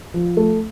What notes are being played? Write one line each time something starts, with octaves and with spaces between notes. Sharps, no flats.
F3
A3